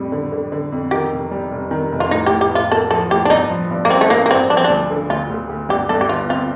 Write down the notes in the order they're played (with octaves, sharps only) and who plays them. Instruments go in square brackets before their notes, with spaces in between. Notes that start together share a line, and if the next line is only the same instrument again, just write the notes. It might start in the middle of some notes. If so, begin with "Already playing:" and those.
Already playing: [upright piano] F2 A2 G3
D3
D3
D3
F2
[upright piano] D#3 [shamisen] G4
[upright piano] F1
G3
F1
D#3
F1
[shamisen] F4
[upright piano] A2 [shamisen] D#4
[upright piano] A2 [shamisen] G4
[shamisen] G4
[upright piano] A2 [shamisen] F4
[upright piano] A#3 [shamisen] A4
[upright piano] F3 [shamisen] A4
[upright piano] A2 [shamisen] G4
[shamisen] D4
[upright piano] G2 [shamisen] D#4
[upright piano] F3
G2
[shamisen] A#3
[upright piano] A1 [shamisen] C4
[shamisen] A3
[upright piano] A1 [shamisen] A#3
[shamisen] A#3
[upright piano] G2 [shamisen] C4
[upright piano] F3 [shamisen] D4
[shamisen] C4
D4
[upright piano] D2
D3
[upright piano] D2 [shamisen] F4
[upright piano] D2
D2
[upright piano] G2 [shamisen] G4
[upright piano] G2 [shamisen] A4
[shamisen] G4
[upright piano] G1 [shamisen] F4
[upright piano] C4 [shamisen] F4